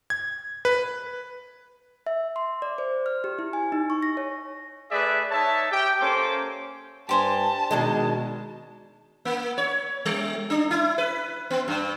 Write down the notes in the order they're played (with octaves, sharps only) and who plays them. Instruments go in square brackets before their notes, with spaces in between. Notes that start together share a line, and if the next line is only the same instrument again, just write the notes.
[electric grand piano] G#6
B4
[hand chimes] E5
C6
D5
C5
F6
G4
E4
G#5
D#4
C#6
A#6
C#5
[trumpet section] A3 G#4 B4 D5 E5
D#4 C#5 E5 A5
G4 G5
A#3 C#4 A4 C5 D6
[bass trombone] G2 [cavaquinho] G4 C5 G#5 [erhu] A5
[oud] B2 D#3 G#3 [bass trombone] D4
[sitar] A#3
C#5
G3
D4
E4
B4
B3
G2